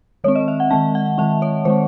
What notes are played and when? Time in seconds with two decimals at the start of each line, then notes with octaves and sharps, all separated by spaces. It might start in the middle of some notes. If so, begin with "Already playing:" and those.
0.24 D#3 G#3 C4 C#5
0.35 D#5
0.48 E5
0.60 F#5
0.71 D#3 G#3 C4 A5
0.95 F#5
1.18 D#3 G#3 C4 E5
1.42 C#5
1.65 D#3 G#3 C4 C5